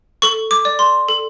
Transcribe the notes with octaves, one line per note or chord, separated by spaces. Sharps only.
A4 C#6
D6
D5
C6
A4